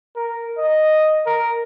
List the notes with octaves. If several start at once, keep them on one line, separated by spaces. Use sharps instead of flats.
A#4
D#5
A#4